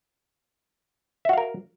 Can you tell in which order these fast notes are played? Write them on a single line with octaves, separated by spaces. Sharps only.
E5 F#4 F5 A#4